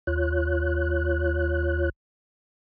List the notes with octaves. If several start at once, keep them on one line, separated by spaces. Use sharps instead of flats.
D#2 F4 C#5 F#6